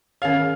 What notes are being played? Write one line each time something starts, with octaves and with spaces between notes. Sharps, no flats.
D#3 C#4 G#4 C#5 F5